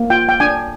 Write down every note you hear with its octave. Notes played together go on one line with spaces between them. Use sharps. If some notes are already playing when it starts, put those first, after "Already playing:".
Already playing: A#3
F4 G5
G5
D4 G#5